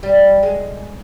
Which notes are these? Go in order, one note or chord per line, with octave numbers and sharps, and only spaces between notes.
G3
G#3